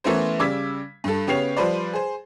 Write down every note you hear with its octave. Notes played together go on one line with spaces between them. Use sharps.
E3 A3 B3 C#4 A#4 C5
C#3 G3 D6 E6 G#6 B6
G2 A4
C#3 B3 G4 C#5 C7 F7
F3 G3 B4 C5 D5
G#4 C5